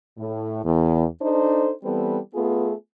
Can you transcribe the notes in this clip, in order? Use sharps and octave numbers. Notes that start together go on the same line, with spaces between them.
A2
E2
D4 D#4 A4 C5
E3 G3 B3 C4 A4 B4
A3 B3 F4 G#4